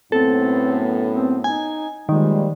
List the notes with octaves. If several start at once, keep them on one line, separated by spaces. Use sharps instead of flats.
F#2 A2 B3 C4 A4
C4
D#4 G#5
A#2 D#3 F3 G3 G#3